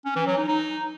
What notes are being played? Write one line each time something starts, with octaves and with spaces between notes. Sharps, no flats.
C#4
E3
F#3
D#4
D#4